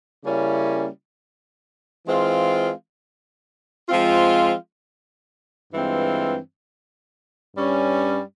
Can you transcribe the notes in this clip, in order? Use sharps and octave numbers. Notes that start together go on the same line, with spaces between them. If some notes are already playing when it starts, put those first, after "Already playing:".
C#3 G3 A#3 C#4 E4
E3 G#3 C4 F4
F3 G#3 C4 F4
G2 E3 G#3 C4 F4
G2 G3 C#4